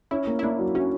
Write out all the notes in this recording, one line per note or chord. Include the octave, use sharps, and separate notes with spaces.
C#4 E4
A#3
E4
A#3 D4
F#3
C#4 F#4